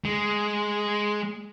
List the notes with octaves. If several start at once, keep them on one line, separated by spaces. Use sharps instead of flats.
G#3